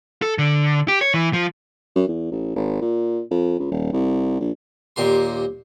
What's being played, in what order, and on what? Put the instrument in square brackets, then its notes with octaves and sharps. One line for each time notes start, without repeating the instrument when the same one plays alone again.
[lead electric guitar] A4
D3
G4
C#5
E3
F3
[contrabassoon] F#2
E2
A1
G#1
A#2
F2
C#2
D#1
C2
A#1
[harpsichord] D#2 A#2 G4 C6